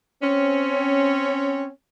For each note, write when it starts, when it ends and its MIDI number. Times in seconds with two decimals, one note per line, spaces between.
0.22 1.69 60
0.22 1.69 61